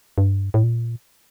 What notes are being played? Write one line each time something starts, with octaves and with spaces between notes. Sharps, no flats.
G2
A2
A#2